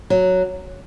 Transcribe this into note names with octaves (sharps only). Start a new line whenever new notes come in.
F#3